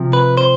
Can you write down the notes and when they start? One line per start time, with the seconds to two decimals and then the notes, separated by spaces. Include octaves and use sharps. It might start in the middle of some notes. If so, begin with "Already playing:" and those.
Already playing: C3 F3
0.13 B4
0.37 C5